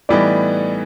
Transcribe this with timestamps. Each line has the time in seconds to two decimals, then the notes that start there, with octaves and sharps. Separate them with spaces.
0.09 A2 E3 G3 B3 D#4 D5